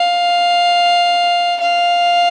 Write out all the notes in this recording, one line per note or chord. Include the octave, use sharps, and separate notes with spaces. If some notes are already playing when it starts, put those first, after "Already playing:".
Already playing: F5
F5